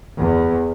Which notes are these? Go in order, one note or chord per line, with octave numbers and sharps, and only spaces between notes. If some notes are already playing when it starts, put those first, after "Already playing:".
E2